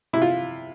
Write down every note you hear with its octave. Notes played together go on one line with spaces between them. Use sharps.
C3 E4
F4